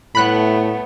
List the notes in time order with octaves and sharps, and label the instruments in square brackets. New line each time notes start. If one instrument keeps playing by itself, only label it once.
[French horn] A2 [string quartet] A3 B3 [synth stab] B5 F#6